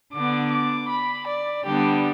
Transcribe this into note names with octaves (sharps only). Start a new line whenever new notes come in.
D3 B3 D4 D6
D6
B5
D5
D3 G3 B3 D4 G4